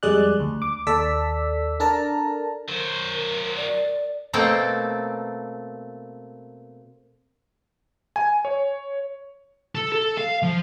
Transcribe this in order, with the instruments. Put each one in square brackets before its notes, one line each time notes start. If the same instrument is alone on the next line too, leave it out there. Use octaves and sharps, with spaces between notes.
[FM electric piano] F2 G3 G#3 G#4 D5 F#6
D2
D6
D#2 A4 D5 E6 B6
D4 A4 A#4 A5 A#5
[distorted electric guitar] F#3 C5 [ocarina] A#4
[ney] D5
[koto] B2 A3 A#3 C4 G5 A5
[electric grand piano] G#5
C#5
[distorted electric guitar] A4
A4
F5
F3